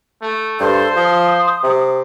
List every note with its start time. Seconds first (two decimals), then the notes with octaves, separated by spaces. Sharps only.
0.22 A3
0.60 G2 A4 C5
0.96 F3 D#6
1.63 C3